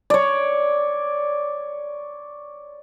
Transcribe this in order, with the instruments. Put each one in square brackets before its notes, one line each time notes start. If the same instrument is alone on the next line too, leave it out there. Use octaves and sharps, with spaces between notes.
[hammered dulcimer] C#5 D5